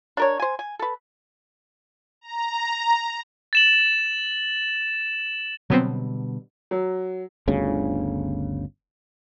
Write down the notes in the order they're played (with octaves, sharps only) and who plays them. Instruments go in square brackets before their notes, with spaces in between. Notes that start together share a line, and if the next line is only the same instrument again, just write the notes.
[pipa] D4 A#4 C#5
C5 G#5
G#5
A4 B4
[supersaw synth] A#5
[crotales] A6 E7 F#7
[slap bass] B2 D3 G3 [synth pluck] F#3 B3 C4
[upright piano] F#3
[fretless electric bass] G1 D2 C#3